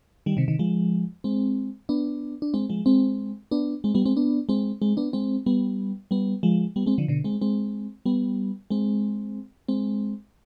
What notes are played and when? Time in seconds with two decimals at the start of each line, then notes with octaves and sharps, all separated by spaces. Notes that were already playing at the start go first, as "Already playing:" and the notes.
0.26 D#3 G3
0.37 C3 D#3
0.48 C3 D#3
0.59 F3 G#3
1.24 G#3 C4
1.89 B3 D4
2.42 D4
2.54 G#3 C4
2.70 F3 G#3
2.86 G#3 C4
3.51 B3 D4
3.84 G#3 C4
3.95 G3 B3
4.06 G#3 C4
4.17 B3 D4
4.49 G#3 C4
4.81 G#3 C4
4.97 B3 D4
5.13 G#3 C4
5.46 G3 B3
6.11 G3 B3
6.43 F3 G#3
6.76 G3 B3
6.86 G#3 C4
6.98 D3 F3
7.08 B2 D3
7.24 G#3 C4
7.41 G#3 C4
8.06 G3 B3
8.70 G#3 C4
9.68 G#3 C4